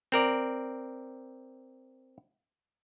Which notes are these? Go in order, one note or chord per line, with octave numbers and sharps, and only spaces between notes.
C4 A#4 D5